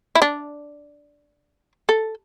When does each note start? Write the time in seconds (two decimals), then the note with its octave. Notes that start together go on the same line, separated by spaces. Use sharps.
0.15 E4
0.22 D4
1.89 A4